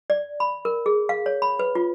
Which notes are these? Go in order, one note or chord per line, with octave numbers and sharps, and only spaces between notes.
D5
B5
A#4
G#4
F5
C#5
B5
B4
F4